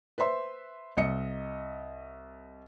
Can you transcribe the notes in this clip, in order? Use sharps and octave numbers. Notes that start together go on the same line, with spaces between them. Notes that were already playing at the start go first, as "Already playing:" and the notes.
B4 C5 E5 C6
C2 D#5 C#7